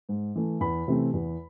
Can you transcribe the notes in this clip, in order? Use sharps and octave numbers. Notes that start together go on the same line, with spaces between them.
G#2
E3 A3
E2 B5
C3 E3 A3 C4
E2